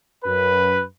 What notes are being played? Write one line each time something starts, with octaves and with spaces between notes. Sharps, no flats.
F#2 B4